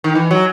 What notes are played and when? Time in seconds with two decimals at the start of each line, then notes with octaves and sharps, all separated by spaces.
0.04 D#3
0.15 E3
0.31 F#3